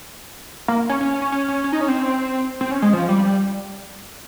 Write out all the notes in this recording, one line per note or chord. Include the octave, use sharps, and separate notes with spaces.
A#3
C#4
C#4
C#4
C#4
C#4
C#4
C#4
D#4
C#4
C4
C4
C#4
G#3
F3
G3
G3